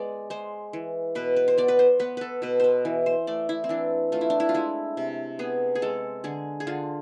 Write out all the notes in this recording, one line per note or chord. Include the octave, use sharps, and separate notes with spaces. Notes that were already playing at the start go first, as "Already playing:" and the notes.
Already playing: G#3 B3 D5
G#3 C5
E3
B2 B4
B4
C5
B3 D5
B4
C5
B3 B4
A4 B4
B2 B4
B4 C5
E3
C5
A3 D5
E4
C4
E3 D4
A3 F4
E4
D4
E4
F4
G#3 E4
C3
B3 G#4
G#4
G#3 A4
D3 G#4
G#4
D3 F4